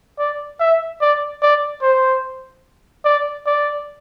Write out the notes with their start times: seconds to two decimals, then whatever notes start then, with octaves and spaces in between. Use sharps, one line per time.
0.19 D5
0.60 E5
1.01 D5
1.42 D5
1.83 C5
3.05 D5
3.46 D5